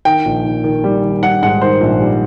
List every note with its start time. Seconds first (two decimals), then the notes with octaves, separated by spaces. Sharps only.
0.05 D#3 G5
0.25 A#1
0.45 D#3
0.64 D#3
0.84 G3
1.04 D#3
1.23 G3 F#5
1.42 G#2 F#5
1.62 D#3 C5
1.81 A#1
2.00 G3